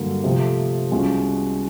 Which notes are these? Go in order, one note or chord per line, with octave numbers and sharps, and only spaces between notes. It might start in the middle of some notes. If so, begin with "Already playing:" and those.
Already playing: G2 D3 F#3 A#3
C3 F3 A3 C4
C2 B2 G#3 C#4 F4